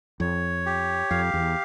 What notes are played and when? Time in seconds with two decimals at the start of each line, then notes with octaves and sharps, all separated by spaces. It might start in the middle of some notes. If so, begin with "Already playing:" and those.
0.20 F2 C#5
0.66 G4
1.10 F2 F5
1.34 E2